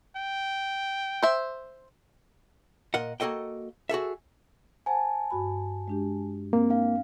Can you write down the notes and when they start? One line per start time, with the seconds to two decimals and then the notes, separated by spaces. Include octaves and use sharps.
0.16 G5
1.23 C5 E5
2.94 A#2 A#4 D#5 F#5
3.20 A#3 F#4 A4 D#5 G5
3.89 F#4 G#4 A4 E5
4.86 C5 F#5 G#5 A5
5.30 G2 F#4 B5
5.88 G#3 D4 G4
6.53 A#3 C4
6.70 D4 F5